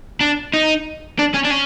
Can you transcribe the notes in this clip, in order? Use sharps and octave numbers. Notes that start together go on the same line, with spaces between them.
D4
D#4
D4
C#4
D4
C#4